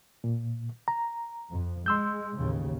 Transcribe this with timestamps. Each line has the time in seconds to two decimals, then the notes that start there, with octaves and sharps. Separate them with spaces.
0.24 A#2
0.88 A#5
1.49 F2
1.86 G#3 C6 E6 G6
2.36 A1 D#2 C#3